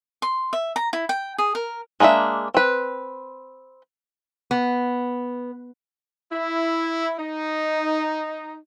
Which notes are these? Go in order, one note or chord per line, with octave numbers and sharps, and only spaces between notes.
C6
E5
A#5
E4
G5
G#4
A#4
G#3 A#3 D4 G#4 E5
C4 B4
B3
E4
D#4